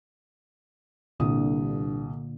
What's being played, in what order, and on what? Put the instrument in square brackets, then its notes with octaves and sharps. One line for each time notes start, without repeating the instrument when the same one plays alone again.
[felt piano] C2 D#6 [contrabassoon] G2 [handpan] A#2 D3